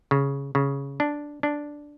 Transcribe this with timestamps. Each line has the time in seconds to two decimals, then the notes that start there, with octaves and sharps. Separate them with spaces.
0.11 C#3
0.55 C#3
1.00 D4
1.43 D4